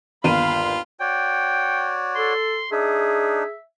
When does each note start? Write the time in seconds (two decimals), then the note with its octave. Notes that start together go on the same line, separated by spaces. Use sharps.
0.24 G1 D#2 F4 F5 B5 D#7
1.00 F#4 C#5 D5 G5
2.15 A4 C6
2.72 D4 D#4 G#4 E5